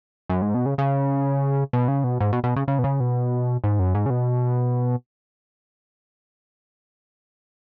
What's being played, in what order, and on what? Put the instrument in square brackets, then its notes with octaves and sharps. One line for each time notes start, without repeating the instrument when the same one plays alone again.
[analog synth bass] F#2
G#2
B2
C#3
C#3
B2
C#3
B2
G#2
B2
B2
C#3
C#3
B2
C#3
B2
G#2
F#2
G#2
C#3
B2